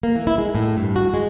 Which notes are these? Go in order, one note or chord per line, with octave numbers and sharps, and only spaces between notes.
A#3
E3
E4
G#3
A2
G2
F#4
G#3